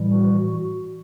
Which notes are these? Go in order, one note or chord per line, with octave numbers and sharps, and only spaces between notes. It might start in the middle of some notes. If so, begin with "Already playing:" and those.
Already playing: A2 E3 G3
F#4